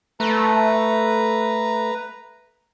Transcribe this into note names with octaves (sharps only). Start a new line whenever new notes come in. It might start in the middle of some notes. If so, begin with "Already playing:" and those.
A3 B4 A#5